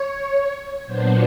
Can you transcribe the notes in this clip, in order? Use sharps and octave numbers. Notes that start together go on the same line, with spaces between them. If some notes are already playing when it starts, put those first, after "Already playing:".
Already playing: C#5
A#2 F#3 B3 D4 C5